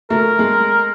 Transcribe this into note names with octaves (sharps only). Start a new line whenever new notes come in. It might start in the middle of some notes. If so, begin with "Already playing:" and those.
A3 A#4
G#3